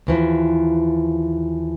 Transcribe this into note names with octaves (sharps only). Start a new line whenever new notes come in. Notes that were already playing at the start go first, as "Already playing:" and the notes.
D#2 E3 F3